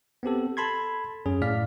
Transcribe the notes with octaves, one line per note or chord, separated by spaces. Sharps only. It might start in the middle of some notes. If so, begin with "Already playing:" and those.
B3 C4 G4 A4
A4 A5 B5 C6 G#6
F#2 C#4 G#4
A2 D5 F5 F6 B6